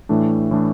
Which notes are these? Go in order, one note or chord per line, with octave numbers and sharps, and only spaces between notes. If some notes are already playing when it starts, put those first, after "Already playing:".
A2 E3 A3 D4
A2 E3 A3 D4